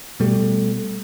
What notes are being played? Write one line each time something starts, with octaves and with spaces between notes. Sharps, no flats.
B2 G3 A3